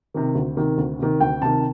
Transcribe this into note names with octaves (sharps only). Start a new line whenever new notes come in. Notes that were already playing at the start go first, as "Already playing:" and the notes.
C3 D#3
D2
C3 D#3
D2
C3 D#3
D2 G5
C3 D#3 A5